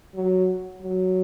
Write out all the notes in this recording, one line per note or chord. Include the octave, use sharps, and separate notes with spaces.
F#3
F#3